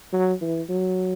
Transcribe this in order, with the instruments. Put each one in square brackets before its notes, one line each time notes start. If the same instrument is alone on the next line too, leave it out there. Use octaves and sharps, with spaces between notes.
[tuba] F#3
E3
F#3